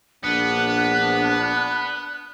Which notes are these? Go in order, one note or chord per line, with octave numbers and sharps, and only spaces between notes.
A#1 B3 D4 F#6